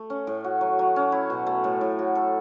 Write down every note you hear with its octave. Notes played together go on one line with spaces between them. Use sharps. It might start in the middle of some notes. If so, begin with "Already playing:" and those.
Already playing: A3
C#4
A2
F#4
F#3
F#3
C#4
E4
B2
A3
A2
A2
F#4
A4